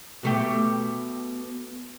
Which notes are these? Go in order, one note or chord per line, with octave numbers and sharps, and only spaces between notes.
B2 A3 G4